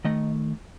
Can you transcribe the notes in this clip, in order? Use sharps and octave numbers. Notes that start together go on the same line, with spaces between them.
D#3 A3 D#5